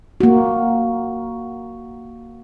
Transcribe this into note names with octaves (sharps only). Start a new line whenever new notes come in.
A#3 F#4